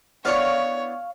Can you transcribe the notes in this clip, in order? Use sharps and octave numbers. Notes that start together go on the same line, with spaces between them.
B3 D4 E4 C#5 F5 C#6